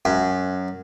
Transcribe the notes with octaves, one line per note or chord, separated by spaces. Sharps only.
F#2